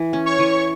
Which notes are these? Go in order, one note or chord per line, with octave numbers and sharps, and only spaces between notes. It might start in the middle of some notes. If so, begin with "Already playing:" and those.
Already playing: E3
C#4
C#5 C#6
E3